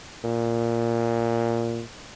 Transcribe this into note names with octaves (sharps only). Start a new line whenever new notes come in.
A#2